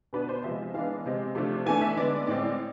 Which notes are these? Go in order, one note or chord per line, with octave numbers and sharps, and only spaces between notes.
B2 B3 D4 B4
C5
C3 F3 G#3 E5
E3 G#3 B3 D4 F5
C3 G#3 C4
C3 F3 A3 D4
E3 A3 D4 G#5
E5
D3 G#3 B3 D4 D5
A2 G#3 C4 D5